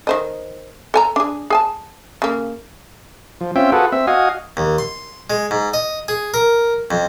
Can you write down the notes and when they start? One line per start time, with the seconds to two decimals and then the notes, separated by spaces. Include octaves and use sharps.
0.07 D#3 C5 D#5
0.94 A4 G#5 A#5
1.16 D4 G#4
1.50 G#4 G#5 A5
2.22 C#3 A#3
3.41 F3
3.56 C4 C#4 F4 E5 G5
3.72 F4 F#4 G#4 A4 B4
3.92 C4 E5
4.07 F#4 D#5 F5 G#5
4.57 D#2
4.78 C6
5.30 G#3
5.51 G#2
5.74 D#5
6.08 G#4
6.34 A#4
6.91 F2